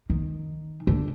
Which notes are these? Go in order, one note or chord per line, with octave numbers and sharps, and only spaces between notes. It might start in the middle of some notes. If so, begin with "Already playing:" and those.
D#3
D3